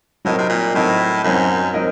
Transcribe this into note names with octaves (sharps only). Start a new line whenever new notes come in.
A2 F#3 C4 D#4 A#4 D#5
C3
A#2
A2 F#3 C4 D#4 A#4 D#5
F#2 F#3 C4 D#4 A#4 D#5
F#3 C4 D#4 A#4 D#5